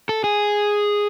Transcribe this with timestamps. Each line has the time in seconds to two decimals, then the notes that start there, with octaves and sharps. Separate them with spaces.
0.09 A4
0.24 G#4